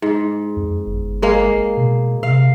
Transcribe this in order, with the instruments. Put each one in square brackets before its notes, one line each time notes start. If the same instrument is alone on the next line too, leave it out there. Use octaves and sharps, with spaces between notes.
[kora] G#2
[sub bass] F2
G1
[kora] G#3 A#3 F5
[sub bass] B2
[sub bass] C3 [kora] F5